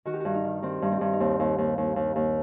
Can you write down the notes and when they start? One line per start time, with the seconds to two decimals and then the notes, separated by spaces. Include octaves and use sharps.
0.05 D#3 F#4
0.13 G4
0.20 G2 F#4
0.34 D#4
0.45 D#3
0.63 D#3 C4
0.82 G2
0.92 C4
1.01 G2
1.13 D#4
1.20 D#2 C4
1.40 D#2
1.58 D#2
1.78 D#2
1.96 D#2
2.16 D#2